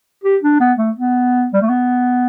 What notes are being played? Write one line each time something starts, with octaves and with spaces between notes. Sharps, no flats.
G4
D4
B3
A3
B3
G3
A3
B3